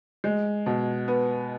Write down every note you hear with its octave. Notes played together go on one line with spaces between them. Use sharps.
G#3
B2
B3